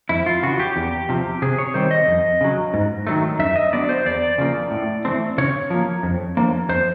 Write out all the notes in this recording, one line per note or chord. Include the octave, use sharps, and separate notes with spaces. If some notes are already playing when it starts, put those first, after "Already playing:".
F2 E4
F4
C#3 E3 F#4
G4
E2
C3 F3
C3 G#4
C#5
D#3 G3 C4 C5
D#5
F2
C#3 F#3
G#2
D#3 F#3 A3
F#2 E5
D#5
D3 F#3 B3 D5
C5
E2 D5
C#3 F3 A#3
A2
E3 A3 C4
C#3 C#5
F3 A#3
F2
D3 F3 A#3
F2 C5